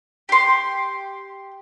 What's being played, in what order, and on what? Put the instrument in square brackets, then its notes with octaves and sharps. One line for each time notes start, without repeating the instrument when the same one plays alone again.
[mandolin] G4 C6